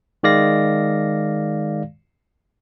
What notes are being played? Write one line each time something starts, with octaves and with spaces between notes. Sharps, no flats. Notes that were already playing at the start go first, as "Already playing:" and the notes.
D#3 G#3 D5 F5 A#6